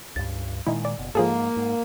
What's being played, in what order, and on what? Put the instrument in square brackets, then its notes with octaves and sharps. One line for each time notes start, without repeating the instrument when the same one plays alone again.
[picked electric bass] C#2 G2 [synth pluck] A6
[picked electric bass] A#2 D#3 G#3 [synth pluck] D#4 E4
[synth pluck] D5
[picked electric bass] F#1 B2
[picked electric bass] G#2 [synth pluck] F3 G#4 A4 [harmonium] A#3
[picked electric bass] G#2